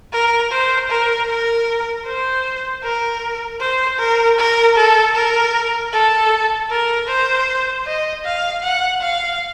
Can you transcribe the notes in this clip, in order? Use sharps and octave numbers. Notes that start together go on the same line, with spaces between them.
A#4
C5
A#4
A#4
C5
A#4
C5
A#4
A#4
A4
A#4
A4
A#4
C5
D#5
F5
F#5
F5